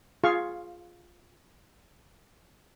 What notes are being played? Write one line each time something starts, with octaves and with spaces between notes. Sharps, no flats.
F4 G#4 F5 C#6